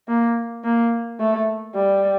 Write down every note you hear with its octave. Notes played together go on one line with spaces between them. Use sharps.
A#3
A#3
A3
G3